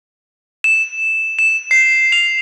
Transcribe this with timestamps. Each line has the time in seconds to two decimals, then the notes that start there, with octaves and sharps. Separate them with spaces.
0.64 E7
1.39 E7
1.71 C7
2.12 F7